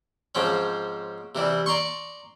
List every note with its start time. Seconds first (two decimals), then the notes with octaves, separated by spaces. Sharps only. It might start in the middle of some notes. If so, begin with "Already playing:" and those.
0.35 G#2 F3 C4 C#4
1.35 C3 E3 G3
1.66 D5 A#5 C6 C#6